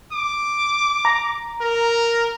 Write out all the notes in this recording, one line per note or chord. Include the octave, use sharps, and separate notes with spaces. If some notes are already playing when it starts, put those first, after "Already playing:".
D6
A#5
A#4